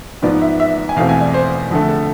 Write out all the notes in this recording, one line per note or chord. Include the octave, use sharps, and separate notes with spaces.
G#2 F3 B3 D5
E5
E5
G#5
E2 B2 A3 C4 F5
G#5
D5
C5
F2 D3 A3
A4